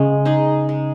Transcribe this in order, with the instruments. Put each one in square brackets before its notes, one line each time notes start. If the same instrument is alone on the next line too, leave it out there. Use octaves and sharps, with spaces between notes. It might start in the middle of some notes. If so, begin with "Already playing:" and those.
Already playing: [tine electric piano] C#3 [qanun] G#3
[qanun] D#4 G#4
G#3